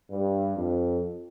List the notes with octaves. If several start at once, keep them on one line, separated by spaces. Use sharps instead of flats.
G2
F2